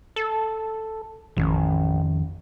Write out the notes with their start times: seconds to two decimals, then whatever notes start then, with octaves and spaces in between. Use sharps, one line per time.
0.16 A4
1.37 A1 F2 D#3 C#4